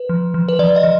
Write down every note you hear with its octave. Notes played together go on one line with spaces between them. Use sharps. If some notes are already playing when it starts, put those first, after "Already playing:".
Already playing: B4
F3
F3
B4
F3 D5
D#5
F3